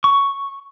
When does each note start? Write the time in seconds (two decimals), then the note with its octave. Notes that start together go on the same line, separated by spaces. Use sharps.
0.04 C#6